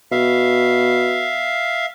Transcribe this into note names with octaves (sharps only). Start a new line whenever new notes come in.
B2 E5 F5